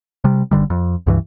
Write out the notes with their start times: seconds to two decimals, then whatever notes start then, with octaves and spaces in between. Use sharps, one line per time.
0.24 C3 G3
0.51 F#1 D2 D3 G3
0.70 F2
1.07 C#2 G2 E3